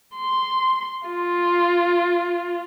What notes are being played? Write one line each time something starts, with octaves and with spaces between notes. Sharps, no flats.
C6
F4